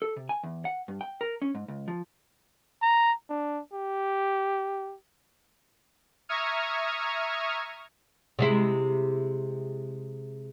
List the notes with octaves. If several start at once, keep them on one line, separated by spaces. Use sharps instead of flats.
A4
C3
G#5
E2
F#5
G2
G5
A#4
C#4
G#2
C#2
F3
A#5
D4
G4
E5 A#5 C#6 D#6 F6 G#6
C3 G#3 E4